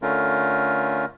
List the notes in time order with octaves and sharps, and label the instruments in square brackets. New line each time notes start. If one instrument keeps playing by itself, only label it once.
[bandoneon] D3 A3 C#4 F4 A#4